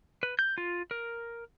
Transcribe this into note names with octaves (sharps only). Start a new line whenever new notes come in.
B4
G6
F4
A#4